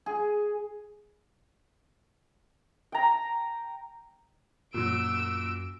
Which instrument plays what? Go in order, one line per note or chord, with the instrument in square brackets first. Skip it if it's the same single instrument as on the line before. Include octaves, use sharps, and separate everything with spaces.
[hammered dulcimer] G#4
[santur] G5 A#5
[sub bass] F#2 [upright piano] A#2 F#3 [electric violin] E6 D7